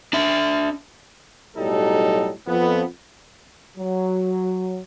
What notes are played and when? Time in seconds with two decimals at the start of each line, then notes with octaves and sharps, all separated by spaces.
0.13 D4 E5
1.57 B1 A2 F#3 G3 D#4 A4
2.48 F2 F3 B3
3.78 F#3